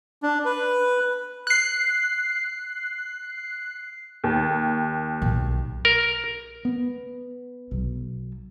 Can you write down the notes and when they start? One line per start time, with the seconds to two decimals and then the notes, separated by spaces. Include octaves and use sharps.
0.23 D4
0.45 B4
1.47 F#6 C7
4.24 D#2
5.22 B1
5.85 A#4
6.65 B3
7.71 B1